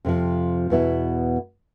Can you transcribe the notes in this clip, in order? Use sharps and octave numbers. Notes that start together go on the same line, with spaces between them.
F2 C3 F3
E2 B2 B3 E4